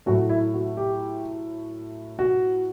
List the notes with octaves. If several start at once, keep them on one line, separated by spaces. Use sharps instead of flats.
A2 F#3 A3 F#4
E4
F#4
G4
F#4